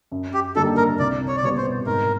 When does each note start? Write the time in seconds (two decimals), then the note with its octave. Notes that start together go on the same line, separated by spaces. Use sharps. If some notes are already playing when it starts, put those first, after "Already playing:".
0.12 F#2
0.33 G4
0.55 D3 G3 A#3 D#4 A4
0.77 A#4
0.99 C2 D5
1.28 C#5
1.37 D5
1.42 B2 G3 B3 C#5
1.58 C5
1.86 G#2 A#4